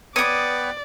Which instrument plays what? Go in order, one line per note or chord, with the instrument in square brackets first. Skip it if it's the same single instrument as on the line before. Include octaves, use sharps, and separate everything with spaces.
[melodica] B3 B4 G5 [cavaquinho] C#5 D6 [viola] D5 [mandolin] D#6